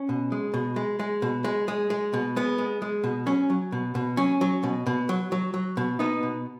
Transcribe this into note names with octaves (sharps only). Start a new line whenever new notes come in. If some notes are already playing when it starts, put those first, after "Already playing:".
Already playing: C#4
B2
G#3
B2
G#3
G#3
B2
G#3
G#3
G#3
B2
G#3 B3
G#3
G#3
B2
F#3 C#4
F#3
B2
B2
F#3 C#4
F#3
B2
B2
F#3
F#3
F#3
B2
B2 B3 D#4
B2